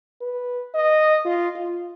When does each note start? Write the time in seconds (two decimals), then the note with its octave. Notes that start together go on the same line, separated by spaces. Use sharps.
0.21 B4
0.75 D#5
1.25 F4
1.56 F4